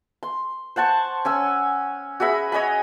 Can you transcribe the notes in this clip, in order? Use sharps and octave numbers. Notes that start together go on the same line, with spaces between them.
C6
C5 F#5 A5 C#6
C#4 G#5 E6
F#4 G#4 E5 B5
C#5 D#5 G#5 B5